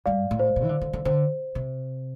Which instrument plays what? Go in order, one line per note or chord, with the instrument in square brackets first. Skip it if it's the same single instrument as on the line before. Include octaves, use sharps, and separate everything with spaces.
[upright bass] G2 [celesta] D5 F5
[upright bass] A2
[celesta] C5
[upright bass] A#2
E3
D3
D3
D3
[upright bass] D3 [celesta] C5
[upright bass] C3